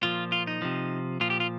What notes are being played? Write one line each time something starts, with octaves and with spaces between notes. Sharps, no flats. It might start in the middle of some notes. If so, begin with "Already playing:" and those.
A#2 F3 F4
F4
D#4
C3 F3
A#2 F3 F4
G4
F4